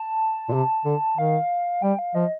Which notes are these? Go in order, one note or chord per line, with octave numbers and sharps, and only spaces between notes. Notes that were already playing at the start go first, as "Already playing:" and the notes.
Already playing: A5
A#2
C3
D3
D#3 F5
G3 G5
F5
F3 D#5